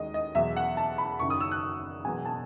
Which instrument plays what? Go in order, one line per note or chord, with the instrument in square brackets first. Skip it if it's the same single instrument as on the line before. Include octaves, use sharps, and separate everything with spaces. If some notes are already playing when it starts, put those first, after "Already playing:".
Already playing: [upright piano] D#2 D#3 G#3 D#5
D#5
E2 B2 F#3 E5
F#5
A5
B5
F#1 F#2 D#3 C#6
D#6
E6
F#6
E1 E2 B2 F#3 G#5
A5